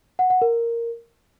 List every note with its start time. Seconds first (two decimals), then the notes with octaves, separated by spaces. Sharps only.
0.19 F#5
0.30 F#5
0.42 A#4